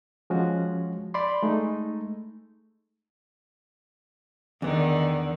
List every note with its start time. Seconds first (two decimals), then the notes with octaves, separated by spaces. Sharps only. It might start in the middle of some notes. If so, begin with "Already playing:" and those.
0.30 F3 G#3 C#4 F#4
1.14 D5 B5 C6
1.43 G#3 A3 D#4
4.62 E2 D3 D#3 B3